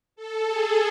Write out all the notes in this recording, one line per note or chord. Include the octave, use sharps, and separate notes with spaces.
A4
G#4